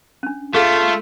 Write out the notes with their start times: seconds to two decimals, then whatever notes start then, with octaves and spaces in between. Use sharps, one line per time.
0.23 C#4 D4
0.54 A3 F4 G#4 A4 F5